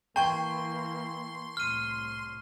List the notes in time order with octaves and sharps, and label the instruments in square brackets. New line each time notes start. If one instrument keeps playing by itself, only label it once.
[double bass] E3 A#3 [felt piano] G5 [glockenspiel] A5 C#6 G#6 [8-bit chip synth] C6
[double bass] C2 A2 [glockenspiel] F6 D#7